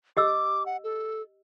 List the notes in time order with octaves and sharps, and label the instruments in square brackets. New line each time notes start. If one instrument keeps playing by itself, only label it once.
[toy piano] G4 D#5 E6 [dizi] D6
[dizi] F#5
A4